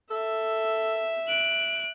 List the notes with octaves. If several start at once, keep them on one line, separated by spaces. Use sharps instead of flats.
A4 E5
F#6 D7